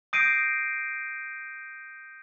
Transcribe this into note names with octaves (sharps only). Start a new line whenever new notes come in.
D#6 G6 A#6 C7 D7 D#7